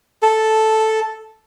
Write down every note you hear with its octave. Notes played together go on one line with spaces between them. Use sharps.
A4